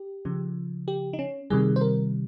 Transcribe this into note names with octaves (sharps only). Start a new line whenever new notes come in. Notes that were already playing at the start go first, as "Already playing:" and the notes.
Already playing: G4
C#3 F3
G4
D#4
C#4
C3 D#3 G3 G#4
C5
A#4